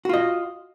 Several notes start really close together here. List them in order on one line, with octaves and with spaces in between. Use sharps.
F#4 F4 D#5